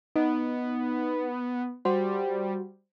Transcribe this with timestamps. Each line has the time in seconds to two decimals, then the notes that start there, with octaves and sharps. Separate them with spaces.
0.16 B3 D#4
1.85 G3 F#4 C5